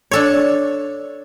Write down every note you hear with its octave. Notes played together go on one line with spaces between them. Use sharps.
D4 A4 C#5